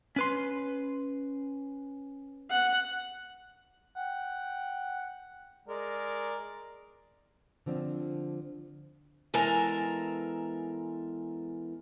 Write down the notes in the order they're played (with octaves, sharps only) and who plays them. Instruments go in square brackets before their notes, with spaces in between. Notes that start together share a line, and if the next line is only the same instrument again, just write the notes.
[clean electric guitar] C#4 B4 C6
[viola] F#5
[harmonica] F#5 G5
G#3 A#4 D5
[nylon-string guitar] D3 F3 C4 D4
[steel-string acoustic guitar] E2 G#3 A4 A#4 A#5